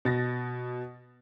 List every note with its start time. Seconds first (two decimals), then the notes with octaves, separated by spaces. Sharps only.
0.05 B2 A6 A#6